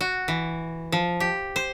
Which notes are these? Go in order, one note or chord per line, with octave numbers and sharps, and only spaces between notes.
F#4
E3
F3
G4
C5